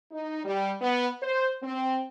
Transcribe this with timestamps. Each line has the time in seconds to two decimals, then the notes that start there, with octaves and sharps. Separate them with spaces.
0.11 D#4
0.44 G3
0.81 B3
1.21 C5
1.62 C4